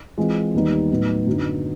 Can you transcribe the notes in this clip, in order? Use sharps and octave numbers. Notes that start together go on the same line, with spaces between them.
E3 G#3 C4 F4
D#2 D#3 G3 B3 D#4
A2 F#3 B3 D#4
F#2 D3 F#3 B3 D#4